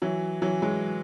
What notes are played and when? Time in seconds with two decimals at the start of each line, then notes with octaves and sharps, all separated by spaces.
0.02 E3 F#3
0.42 E3 F#3
0.62 F#3 G#3